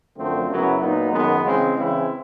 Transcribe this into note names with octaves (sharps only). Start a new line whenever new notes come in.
F#2 D3 F3 A3 C4
F#2 C#3 F#3 B3 E4
A#2 F#3 B3 D#4
F#2 D#3 G#3 B3
C#3 E3 G#3 C4
C#3 E3 G#3 C4 E4